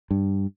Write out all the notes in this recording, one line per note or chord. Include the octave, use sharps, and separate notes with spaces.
G2